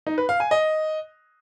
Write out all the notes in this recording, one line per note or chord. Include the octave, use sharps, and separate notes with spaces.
D#4
B4
F5
G#5
D#5